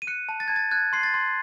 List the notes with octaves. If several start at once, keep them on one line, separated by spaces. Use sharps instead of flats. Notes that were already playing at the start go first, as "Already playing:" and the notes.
D#7
F#6 C#7
A5
A6
A5 G#6
A6
F#6 G#6
C6 C7
A6
C6